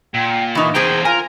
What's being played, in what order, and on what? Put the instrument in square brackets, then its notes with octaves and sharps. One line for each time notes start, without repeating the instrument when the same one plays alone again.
[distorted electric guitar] A#2 [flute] G5
[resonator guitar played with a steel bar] E3 D#4 [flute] C#6
[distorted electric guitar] E2 G5 [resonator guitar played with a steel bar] A#3 C4 G#4 [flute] C5
[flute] F4 [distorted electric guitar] A#4 [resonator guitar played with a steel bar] G#5